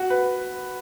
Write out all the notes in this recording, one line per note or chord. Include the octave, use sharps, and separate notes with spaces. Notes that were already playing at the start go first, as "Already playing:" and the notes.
Already playing: F#4
B4